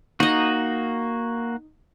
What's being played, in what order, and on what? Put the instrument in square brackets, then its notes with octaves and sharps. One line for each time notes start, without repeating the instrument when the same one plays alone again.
[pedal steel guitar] A#3 F#4 [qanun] D#4 D#5